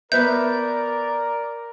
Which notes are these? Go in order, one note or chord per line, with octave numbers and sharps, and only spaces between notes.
B3 A#4 B4 D5 E5 G6